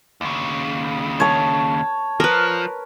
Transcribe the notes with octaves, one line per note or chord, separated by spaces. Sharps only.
D#2 C#3
C#5 A5
F3 A#4 B4